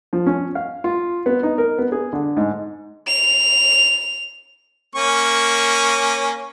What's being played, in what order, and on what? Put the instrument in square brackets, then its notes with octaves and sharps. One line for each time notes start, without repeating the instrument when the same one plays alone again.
[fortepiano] F3
C#4
F5
F4
B3
D#4
A#4
B3
G#4
D3
G#2
[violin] F7
[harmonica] A#3 C#4 C#6